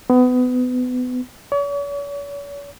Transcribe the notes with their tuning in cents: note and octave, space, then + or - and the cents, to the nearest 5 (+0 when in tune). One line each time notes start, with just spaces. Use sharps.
B3 +25
C#5 +45